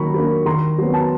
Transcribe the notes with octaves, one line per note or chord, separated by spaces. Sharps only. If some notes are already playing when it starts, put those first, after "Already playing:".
Already playing: D#3 F#3 A#3 A#5 B5 C#6
F#3 A#3 D4
D#3 A#5 C6
F#3 B3
A5
A#5